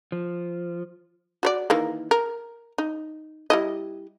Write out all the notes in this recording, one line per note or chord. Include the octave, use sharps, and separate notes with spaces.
F3
F#4 C#5 D5
D#3 E3 A#3
A#4
D#4
G3 E4 D#5